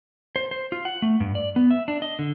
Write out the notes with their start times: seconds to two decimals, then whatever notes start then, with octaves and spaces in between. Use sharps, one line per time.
0.36 C5
0.51 C5
0.72 F4
0.85 F#5
1.02 A3
1.20 G2
1.35 D5
1.56 B3
1.71 E5
1.88 D4
2.02 D#5
2.19 D3